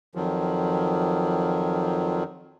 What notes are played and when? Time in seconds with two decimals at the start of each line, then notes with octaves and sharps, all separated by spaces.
0.15 F2 D#3 F3 F#3